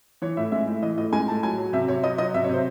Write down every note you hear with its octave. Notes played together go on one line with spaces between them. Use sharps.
E3 C#5
A2 E5
G#3 E5
A2
E3 D#5
A2 D#5
G#3 G#5
A2 A5
F#3 G#5
F#3
C3 E5
C3 C#5
F#3 D#5
F#3 D#5
C3 E5
C#5
C3 C5